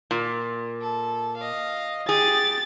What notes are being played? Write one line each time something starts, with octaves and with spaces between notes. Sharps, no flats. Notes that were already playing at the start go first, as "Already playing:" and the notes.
A#2
A4
D#5 F5
G4 G#4 A6